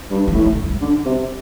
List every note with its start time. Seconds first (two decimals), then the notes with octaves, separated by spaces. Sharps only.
0.11 G2
0.27 E3
0.34 A2
0.45 E3
0.64 G3
0.81 D3
1.05 C3